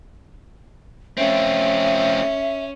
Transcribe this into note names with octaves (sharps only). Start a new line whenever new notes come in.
A3 C4 C#4 E5